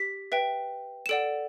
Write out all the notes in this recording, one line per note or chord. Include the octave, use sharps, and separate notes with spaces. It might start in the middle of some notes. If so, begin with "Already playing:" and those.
Already playing: G4 B6
B4 E5 G5
E7
A4 D5 F#5 D7